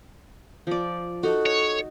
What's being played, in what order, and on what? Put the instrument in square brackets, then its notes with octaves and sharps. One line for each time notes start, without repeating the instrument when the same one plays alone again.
[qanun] F3 D5
[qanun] D#4 F#4 [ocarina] A4
[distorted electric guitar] C#5